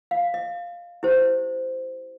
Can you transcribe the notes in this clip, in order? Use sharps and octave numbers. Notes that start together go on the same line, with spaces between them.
F5
D#5
E4 G4 C5